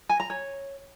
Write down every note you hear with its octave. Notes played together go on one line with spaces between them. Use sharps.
G#5
A#5
C#5